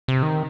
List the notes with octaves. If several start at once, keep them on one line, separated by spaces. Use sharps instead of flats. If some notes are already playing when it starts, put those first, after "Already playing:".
C3
D#3